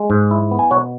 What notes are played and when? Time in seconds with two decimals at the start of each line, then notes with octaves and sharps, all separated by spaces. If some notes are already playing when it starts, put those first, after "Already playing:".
Already playing: G#3
0.10 G#2
0.31 E4
0.51 B3
0.59 G#5
0.71 B2 C#5 F#5